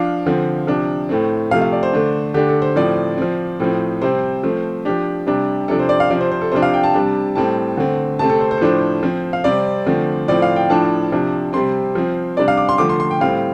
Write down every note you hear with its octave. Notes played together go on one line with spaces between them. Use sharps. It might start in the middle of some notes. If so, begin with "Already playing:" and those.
Already playing: F3 D4 F5
D3 F3 C4
C3 F3 D4
A2 A3 C4
C3 F3 A3 F5
F5
D5
C5
D3 A3 D4
D3 A3 D4 G4
A4
C5
A2 F3 C4 D5
F3 C4
A2 F3 C4
C3 G3 C4 C5
F3 A3 C4
F3 D4 G4
C3 G3 D4
C3 F3 D4 A4
C5
D5
F5
C3 F3 C4 D5
C5
C5
A4
C3 F3 D4 C5
F5
G5
A5
C3 G3 D4
A2 G3 C4 A5
D3 A3 C4
C3 A3 C4 A5
A4
C5
C5
A4
A2 F3 A3 D4 C5
F3 C4
F5
C3 G3 C4 D5
D3 F3 A3 C4
A2 F3 C4 D5
F5
G5
A2 F3 D4 A5
C3 F3 D4
C3 G3 C4 C6
F3 C4
C3 G3 D4 D5
F5
D6
C6
D3 F3 A3 D6
C6
C6
G5
A2 G3 C4 F5